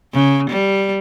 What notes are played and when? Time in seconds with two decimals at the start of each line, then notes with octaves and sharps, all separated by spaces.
0.13 C#3
0.50 G3